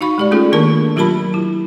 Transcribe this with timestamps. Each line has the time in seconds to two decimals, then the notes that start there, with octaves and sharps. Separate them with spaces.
0.01 D#4 F#4 F5 B5 C#6
0.18 G#3 G4 D5
0.31 A3 C#4 F4 G#4 A4
0.52 D#3 A#3 D4 A#4 A5 C#6
0.96 F#3 F4 G4 A#4 A5 B5
1.34 E4